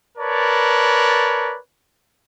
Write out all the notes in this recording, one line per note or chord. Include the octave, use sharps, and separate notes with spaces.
A#4 B4 C#5 D5 A5